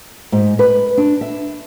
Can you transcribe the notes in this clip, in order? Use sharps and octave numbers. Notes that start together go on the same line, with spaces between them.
G#2
B4
D4
E5